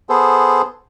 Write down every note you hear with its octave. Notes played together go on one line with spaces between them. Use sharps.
B3 G#4 A4 C5